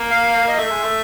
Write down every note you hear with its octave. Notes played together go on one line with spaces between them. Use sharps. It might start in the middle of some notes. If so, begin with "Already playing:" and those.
Already playing: A#3
F5
D#5
A3 E5
G#3
A3